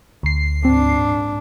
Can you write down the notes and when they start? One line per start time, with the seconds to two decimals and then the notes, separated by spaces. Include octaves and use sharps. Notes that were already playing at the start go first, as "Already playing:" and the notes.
0.23 D2 C7
0.65 G#2 C4 D4